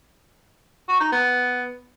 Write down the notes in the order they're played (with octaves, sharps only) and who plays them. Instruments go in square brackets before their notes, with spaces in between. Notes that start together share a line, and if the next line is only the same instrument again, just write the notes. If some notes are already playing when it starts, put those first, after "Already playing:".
[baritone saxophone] F#4
D#4
B3